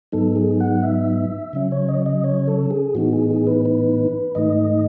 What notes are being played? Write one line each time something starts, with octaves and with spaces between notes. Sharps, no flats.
G#2 F#3 B3 D#4 A4
G#4
F#5
E5
C#3 F#3 C#4
C#5
D#5
D#5
C#5
A4
G#4
A2 E3 B3 D#4 F#4
G#4
G#4
B4
B4
G#2 D#3 A3 D#4 D#5